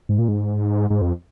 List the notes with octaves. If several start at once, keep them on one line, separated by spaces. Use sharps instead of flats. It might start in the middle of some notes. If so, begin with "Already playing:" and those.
G#2
A#2
G#2
G#2
F2